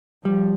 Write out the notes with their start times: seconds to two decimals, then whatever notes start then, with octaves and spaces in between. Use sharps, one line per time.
0.25 F3 G3